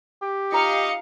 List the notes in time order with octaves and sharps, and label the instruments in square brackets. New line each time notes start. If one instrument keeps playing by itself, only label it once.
[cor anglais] G4
[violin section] D#4 F5 C#7 [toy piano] F4 A#5 [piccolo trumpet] D#5